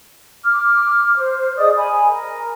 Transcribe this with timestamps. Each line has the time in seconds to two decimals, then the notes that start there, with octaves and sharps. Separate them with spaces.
0.45 D6 F6
1.17 C5
1.58 G#4 D5 D#5 D#6
1.76 G#5 B5
2.09 A#4